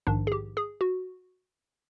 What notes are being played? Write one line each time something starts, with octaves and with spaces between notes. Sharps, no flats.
A#1 G#2 D#3 D4
G#4
G4
G#4
F#4